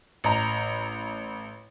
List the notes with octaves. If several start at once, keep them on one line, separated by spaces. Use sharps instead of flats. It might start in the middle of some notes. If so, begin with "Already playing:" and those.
A1 A#5